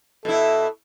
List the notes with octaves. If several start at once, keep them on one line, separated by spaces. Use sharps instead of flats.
B2 E4 A4